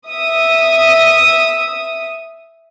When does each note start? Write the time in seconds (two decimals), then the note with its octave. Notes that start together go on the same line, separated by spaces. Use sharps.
0.10 E5 D#6